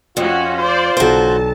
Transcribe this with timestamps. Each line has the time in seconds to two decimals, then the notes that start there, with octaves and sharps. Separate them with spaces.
0.17 F2 C#4 F4 F#4
0.60 C5 D5
0.97 B1 F#4 C5 D5 A5